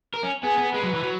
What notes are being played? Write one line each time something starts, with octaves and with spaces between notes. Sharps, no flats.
A#4
C#4
B3 G#4
B3
G#3 B4
F#3
E3
F#3